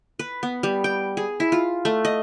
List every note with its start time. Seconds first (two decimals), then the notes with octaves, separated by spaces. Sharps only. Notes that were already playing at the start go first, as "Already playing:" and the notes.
0.19 B4
0.43 B3
0.63 G3
0.84 G5
1.17 G#4
1.40 E4
1.52 F4
1.85 A3
2.05 D#5